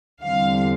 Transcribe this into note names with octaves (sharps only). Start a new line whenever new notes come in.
E2 D3 G3 C4 F5